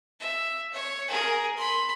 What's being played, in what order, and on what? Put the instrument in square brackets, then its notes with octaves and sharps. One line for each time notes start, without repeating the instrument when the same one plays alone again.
[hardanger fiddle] E5
C#5
G#4 A#4
B5 C6